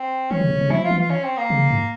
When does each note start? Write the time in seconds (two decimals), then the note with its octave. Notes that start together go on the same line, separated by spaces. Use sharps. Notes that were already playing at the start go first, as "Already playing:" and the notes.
Already playing: C4
0.31 E3 C#4
0.41 C#3
0.51 C3
0.61 C#3
0.70 F3 E4
0.84 F4
0.91 E3
0.97 F4
1.10 C#4
1.24 C4
1.37 A#3
1.50 C#3
1.71 G#2